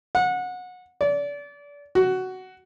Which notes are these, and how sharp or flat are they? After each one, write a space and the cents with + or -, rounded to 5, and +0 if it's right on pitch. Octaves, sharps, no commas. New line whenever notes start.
F#5 -25
D5 -30
F#4 +10